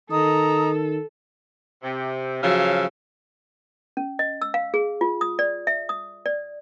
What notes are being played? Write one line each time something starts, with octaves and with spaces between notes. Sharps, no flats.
D#3 A4 D#5 A#5 D#6
C3
C#3 F3 F#3 A4 E5 F5
C#4
D#5
E6
F5
G#4
F4
D#6
D5
E5
D#6
D5